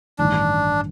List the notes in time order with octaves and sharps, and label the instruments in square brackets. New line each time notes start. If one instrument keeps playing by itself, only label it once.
[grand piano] A1 G2 D#3 [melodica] D4